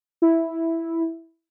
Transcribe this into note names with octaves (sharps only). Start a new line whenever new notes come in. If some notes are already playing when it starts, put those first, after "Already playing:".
E4